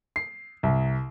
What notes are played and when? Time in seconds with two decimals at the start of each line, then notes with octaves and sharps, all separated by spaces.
0.16 C7
0.63 C2